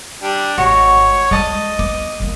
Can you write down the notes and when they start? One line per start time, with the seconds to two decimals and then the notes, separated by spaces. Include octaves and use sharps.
0.22 G3 D4
0.58 G#1 F#4 C#5 D#5
1.31 G#3 D5 D#5 A5 D#6
1.79 B3 D6
2.20 D3 A#3